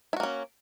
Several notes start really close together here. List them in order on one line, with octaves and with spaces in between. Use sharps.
E4 F#4 A#3 C#4